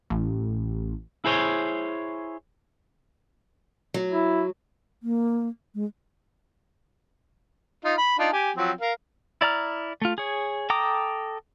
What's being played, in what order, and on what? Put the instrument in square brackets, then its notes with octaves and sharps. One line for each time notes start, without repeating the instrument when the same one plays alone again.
[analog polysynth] A1
[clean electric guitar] E4 G#4 C5 C#5
[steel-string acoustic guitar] F#3
[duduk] E4
[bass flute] A#3
G#3
[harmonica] D#4 F4
B5
D4 D#4 F4
G4 G#5
F3 F#3 C4
A#4 F5
[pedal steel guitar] E4 D5 A#5 F6
A3 F4
G#4 C#5
A4 G5 A#5 D6 D#6